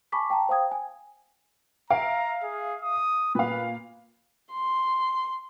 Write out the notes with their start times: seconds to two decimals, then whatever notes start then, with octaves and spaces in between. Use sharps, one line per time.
0.12 G#5 A5 B5 C#6 D6 B6
0.30 G5 A5 A#5
0.49 C5 F5 G5 D#6 G#6
0.72 G#5
1.90 E5 F5 A#5 D7
2.43 G#4
2.82 D#6
3.35 A#2 B4 F5
4.52 C6